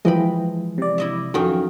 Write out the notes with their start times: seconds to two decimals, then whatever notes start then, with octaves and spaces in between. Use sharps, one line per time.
0.05 E3 F3 G#3 D#5 G5 B5
0.78 C3 D5
0.98 E4 D#5 E5
1.34 F2 D#3 F#3 C#4